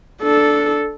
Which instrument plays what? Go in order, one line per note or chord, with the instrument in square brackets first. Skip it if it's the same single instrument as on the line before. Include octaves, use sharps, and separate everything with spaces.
[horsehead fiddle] D4 A4